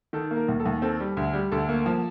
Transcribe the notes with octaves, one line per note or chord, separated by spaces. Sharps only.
D#3 A4
A#3
A#4
D#2
A4
D#2
C4 A4
G3
D2
G3
D2 A4
A#3
F3